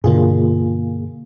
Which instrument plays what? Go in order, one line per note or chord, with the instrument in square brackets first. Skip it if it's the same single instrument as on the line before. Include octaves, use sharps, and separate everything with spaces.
[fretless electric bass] G2 B2 D3 [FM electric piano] A#3 F4 G#4